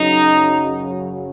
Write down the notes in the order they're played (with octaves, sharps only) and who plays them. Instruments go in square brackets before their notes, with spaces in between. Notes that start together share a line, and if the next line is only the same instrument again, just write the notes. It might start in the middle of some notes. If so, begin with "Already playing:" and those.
Already playing: [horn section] F#2 C#3 F#3 D#4